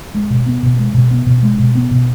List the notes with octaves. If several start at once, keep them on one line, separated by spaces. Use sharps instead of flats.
G#3
B2
B3
B2
G#3
B2
B3
B2
G#3
B2
B3
B2